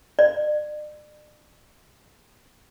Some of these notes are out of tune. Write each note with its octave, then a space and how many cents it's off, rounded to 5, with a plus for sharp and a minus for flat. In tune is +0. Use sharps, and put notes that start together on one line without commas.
D5 +40